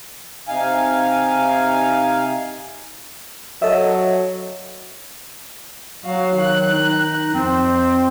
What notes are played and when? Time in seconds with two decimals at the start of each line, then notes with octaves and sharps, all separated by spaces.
0.48 C3 D#4 F5 G#5
3.62 F#3 A4 D#5 E5
6.04 F#3 F#4 F5
6.36 D#3 F#6
6.73 D#4
7.34 F2 C4 C5